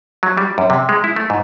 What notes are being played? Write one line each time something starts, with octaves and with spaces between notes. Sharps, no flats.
F#3
G3
F#2
C3
G#3
E4
A3
G#2